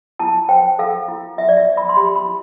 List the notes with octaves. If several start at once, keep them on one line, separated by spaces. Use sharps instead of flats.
E4 A5
C5 G5
A4 F5
E4
E4 E5
D5
E5
C5
B5
C6
G4 B5
B5
E4